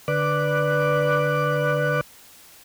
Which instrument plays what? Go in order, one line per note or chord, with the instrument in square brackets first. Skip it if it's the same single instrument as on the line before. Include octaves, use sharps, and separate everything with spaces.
[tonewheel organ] D3 B4 D5 D6 F#6